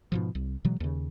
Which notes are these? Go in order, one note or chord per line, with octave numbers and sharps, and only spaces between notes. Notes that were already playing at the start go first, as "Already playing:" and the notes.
G#2 B2 F3
C2
B2 E3 F#3 G#3
D#2 C#3